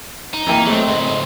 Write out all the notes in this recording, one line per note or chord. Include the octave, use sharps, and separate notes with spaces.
D#4
E3 A#3 G5
F#3 G#3 A3 C4
C#2 G#2 C4 D#5